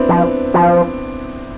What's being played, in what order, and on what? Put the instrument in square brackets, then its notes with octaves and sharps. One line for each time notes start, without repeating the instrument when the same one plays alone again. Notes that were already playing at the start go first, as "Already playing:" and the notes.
Already playing: [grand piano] B3 C4 D4 E4
[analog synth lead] F3
F3